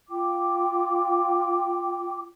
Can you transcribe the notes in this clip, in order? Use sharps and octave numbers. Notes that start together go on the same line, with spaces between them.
F4 G5 D6